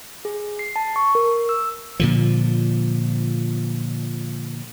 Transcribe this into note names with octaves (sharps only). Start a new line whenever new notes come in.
G#4
C7
A5
C#6
A#4
E6
A#2 D3 F3